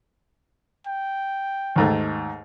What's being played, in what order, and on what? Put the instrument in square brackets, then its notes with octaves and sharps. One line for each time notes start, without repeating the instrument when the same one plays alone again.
[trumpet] G5
[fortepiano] D#2 G#2 A3